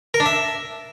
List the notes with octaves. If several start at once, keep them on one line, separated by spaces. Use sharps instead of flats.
A#4
D4
E5